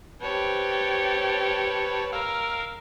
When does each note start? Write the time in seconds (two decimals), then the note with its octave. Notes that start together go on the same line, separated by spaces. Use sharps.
0.22 C4 G4 B4 C#5 A5
2.13 A#4 F5 E6